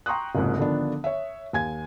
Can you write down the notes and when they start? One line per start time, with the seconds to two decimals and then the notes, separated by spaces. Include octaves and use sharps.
0.06 G5 A#5 C6 C#6 D#6 F#6
0.35 F#1 C2 F2 G#2
0.58 D3 D#3 F3 B3 D4
1.04 C#5 E5
1.53 D#2 G#5 G#6